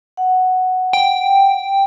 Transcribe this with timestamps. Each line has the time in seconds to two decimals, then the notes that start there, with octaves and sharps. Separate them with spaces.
0.17 F#5
0.93 G5